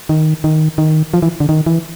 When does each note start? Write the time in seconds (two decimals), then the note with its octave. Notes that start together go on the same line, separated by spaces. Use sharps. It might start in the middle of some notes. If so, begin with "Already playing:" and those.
0.09 D#3
0.44 D#3
0.78 D#3
1.14 F3
1.22 E3
1.40 D3
1.49 D#3
1.66 E3